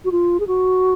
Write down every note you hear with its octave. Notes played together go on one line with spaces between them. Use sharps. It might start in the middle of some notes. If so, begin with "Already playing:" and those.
F#4
F4
G#4
F#4